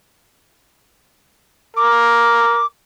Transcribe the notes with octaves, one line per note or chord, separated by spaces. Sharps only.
A#4 D6